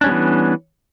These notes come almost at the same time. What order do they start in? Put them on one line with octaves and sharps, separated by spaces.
D4 C#4 G3 B3 E3